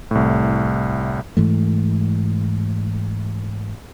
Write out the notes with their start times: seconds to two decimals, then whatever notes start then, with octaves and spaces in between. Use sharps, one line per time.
0.11 C2 A2
1.37 G#2 E3 A3